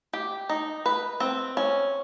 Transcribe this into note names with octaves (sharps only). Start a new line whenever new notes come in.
G4
D#4
B4
C4
C#4